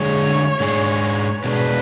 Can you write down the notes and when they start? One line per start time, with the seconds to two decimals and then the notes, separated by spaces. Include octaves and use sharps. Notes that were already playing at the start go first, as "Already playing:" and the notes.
Already playing: D3 G#3 D4 G#4 C#5
0.60 G#2 G#3 D4 G#4
1.44 B2 G#3 D4 B4